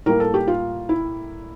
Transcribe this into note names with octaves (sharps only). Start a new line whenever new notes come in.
A2 G3 A#3 A#4
A4
G4
F4
E4